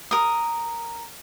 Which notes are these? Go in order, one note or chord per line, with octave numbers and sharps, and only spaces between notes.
A#4 D#6